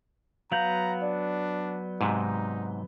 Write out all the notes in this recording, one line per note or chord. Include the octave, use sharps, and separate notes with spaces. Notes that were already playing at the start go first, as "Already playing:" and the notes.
F#3 B3 F5 A#5 G6 F7 F#7
D4 D5
G#2 C3 D#4